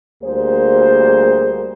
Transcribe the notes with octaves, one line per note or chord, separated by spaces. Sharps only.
D2 G3 A#3 G#4 C5